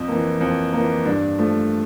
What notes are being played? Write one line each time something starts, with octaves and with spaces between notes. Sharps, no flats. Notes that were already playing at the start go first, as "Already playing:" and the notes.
Already playing: F2 C4
E3 A#3
F2
E3 A#3
G2 D4
F3 A3